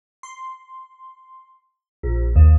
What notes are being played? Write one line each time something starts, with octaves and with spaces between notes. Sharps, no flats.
C6
A#1
D#2